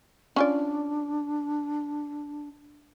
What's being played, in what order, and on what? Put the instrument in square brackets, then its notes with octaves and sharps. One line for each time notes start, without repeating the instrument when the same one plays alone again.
[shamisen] C#4 F4 D5 [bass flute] D4